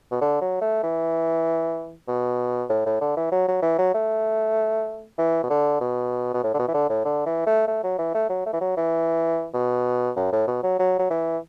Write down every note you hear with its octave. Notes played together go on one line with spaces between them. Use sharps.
B2
D3
F#3
A3
E3
B2
A2
A2
D3
E3
F#3
F#3
E3
F#3
A3
E3
B2
D3
B2
B2
A2
D3
B2
E3
D3
A2
D3
E3
A3
A3
F#3
E3
A3
F#3
A3
E3
F#3
E3
B2
F#2
A2
B2
F#3
F#3
F#3
E3